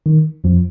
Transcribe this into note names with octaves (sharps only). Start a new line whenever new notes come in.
D#3
F2 F3